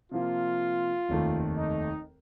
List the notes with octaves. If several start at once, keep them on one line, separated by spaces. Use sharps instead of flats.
C3 F3 A#3 F4
F1 D#2 D#3 A3
D#4